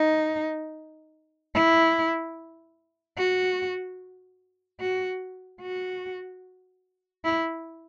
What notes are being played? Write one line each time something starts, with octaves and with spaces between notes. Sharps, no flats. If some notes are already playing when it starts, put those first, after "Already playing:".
Already playing: D#4
E4
F#4
F#4
F#4
E4